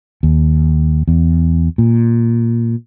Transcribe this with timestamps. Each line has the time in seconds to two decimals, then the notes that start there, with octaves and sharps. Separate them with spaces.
0.23 D#2
1.08 E2
1.78 A#2